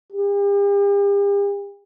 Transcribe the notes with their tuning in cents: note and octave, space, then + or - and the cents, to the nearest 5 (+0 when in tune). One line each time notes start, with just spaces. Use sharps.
G4 +45